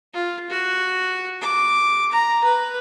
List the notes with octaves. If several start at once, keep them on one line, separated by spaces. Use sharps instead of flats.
F4
F#4
D6
A#5
B4